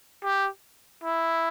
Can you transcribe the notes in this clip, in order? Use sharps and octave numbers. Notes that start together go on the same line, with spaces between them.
G4
E4